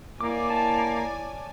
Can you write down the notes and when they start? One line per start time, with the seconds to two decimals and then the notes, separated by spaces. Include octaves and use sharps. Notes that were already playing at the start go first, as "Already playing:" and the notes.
0.21 A#3 E4 C#5 D5 G#5 D6
0.50 A5